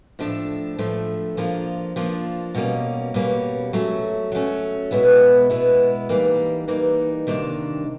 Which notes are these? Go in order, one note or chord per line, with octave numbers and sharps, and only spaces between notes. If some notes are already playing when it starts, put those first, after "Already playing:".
A2 F3 A3 D4
A2 F3 A3 D4
F3 A#3 D4 F4
F3 A#3 D4 F4
B2 G3 A#3 C#4
B2 G3 A#3 C#4
F#3 A3 C#4
F#3 A3 C#4
B2 G#3 B3 E4
B2 G#3 B3 E4
E3 G3 A#3 D#4
E3 G3 A#3 D#4
C3 D#3 G3 A#3 D4